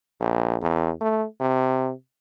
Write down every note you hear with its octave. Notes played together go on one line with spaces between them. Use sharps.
A#1
E2
A3
C3